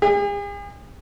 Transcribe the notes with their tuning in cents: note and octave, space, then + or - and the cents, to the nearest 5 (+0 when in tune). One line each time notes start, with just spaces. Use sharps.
G#4 -45